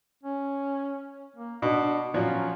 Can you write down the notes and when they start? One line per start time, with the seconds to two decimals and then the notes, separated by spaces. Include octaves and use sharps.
0.23 C#4
1.36 A#3
1.62 B2 D4
2.14 A#2 F3 F#3 C#4